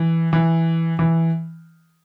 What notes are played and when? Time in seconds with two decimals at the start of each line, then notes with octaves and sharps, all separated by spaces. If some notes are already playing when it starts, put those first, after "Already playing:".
Already playing: E3
0.33 E3
0.99 E3